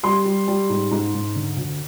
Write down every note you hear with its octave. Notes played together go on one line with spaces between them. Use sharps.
G3 C6
G3
G3
G#2
G#2
G#2
D3
D2